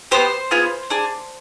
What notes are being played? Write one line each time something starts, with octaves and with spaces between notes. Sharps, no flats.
B3 D#4 G4 C5
B3 F4 G#4
D4 G#4